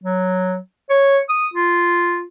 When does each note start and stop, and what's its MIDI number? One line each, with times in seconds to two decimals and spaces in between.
0.04 0.57 54
0.90 1.19 73
1.29 1.48 87
1.54 2.24 65